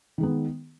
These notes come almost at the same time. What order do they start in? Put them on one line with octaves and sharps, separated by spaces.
D#3 G#3 B3